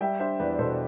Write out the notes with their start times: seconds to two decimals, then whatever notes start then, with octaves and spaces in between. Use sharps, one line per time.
0.01 G3 E5 G5
0.20 D4 C5 E5
0.39 E2 B4 D5
0.58 B2 A4 C5